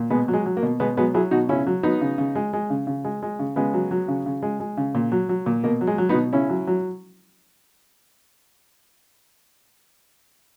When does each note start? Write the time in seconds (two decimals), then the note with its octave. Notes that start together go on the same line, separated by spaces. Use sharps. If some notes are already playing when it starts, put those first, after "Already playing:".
Already playing: A#2
0.10 B2 G#3 B3
0.28 F#3
0.33 G#3
0.46 F#3
0.57 A#3
0.63 B2
0.80 B2 G#3 B3
0.97 F#3 G#3 B3
1.14 F#3 E4 G#4
1.31 B2 D#4 F#4
1.49 C#3 C#4 E4
1.67 F#3
1.83 F#3 B3 D#4
2.01 C#3
2.18 C#3
2.35 G#3
2.53 G#3
2.70 C#3
2.87 C#3
3.04 G#3
3.22 G#3
3.39 C#3
3.56 C#3 G#3 B3
3.73 F#3
3.91 F#3
4.08 C#3
4.26 C#3
4.42 G#3
4.60 G#3
4.77 C#3
4.95 A#2
5.12 F#3
5.29 F#3
5.46 A#2
5.64 B2 A#3
5.81 F#3
5.87 G#3
5.98 F#3
6.09 B3 D#4
6.15 B2
6.33 C#3 C#4 E4
6.49 F#3
6.67 F#3